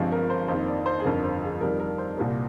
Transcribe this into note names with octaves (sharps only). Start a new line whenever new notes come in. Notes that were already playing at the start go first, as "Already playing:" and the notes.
Already playing: G1 G2 F3 G#3 C4 G#4
A#4
C5
F2 D#3 A#3 C5
D5
C5
G#4
G1 F2 D3 F3 A#4
C5
G#4
F2 D#3 G3 A#4
A#4
C5
C2 A#2 G3 A#3